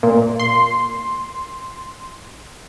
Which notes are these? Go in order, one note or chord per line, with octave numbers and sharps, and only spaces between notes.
A#2
C6